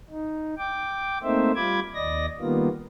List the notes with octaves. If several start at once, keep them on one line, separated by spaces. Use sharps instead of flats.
D#4
G5 D6
A3 A#3 C4 D#4 C5 E5
G3 F4 B5 D6 G#6
D#2 D5 D#5 A#6
D#3 G3 A#3 B3 F4